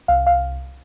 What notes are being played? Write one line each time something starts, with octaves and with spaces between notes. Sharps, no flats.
C2 F5
F5